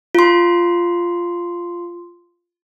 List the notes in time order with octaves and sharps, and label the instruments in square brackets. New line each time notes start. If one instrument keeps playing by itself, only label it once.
[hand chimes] F4 C6